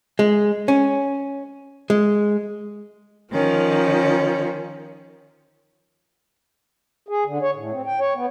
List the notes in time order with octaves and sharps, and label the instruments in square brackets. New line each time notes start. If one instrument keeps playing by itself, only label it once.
[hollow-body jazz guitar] G#3
C#4
G#3
[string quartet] D#3 F3 C#4
[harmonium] G#4
D3
C#5
A2
C4
G5
C#5
B3